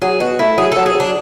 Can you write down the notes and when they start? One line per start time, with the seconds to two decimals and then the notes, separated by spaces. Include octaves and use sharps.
0.02 F#3 G#4
0.20 B2 F#4
0.39 A3 E4
0.57 F#3 G#4
0.72 F#3 A4
0.86 G#4
0.95 F#3
1.00 D4